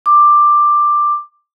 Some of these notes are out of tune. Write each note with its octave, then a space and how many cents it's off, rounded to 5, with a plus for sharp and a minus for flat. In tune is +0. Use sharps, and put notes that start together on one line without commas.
D6 +10